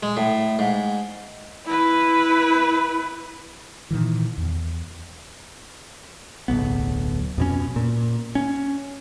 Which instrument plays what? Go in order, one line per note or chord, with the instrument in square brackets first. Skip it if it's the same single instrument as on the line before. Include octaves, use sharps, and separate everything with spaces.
[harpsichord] G#3
A2
G#2
[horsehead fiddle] E4 B4
[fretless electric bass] A#2 D#3 E3
E2
[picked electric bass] D1 B1 B3
F2 B2 C#4
A#2
C#4